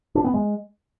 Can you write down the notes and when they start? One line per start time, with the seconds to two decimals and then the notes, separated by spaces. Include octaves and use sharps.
0.15 D4
0.25 B3
0.34 G#3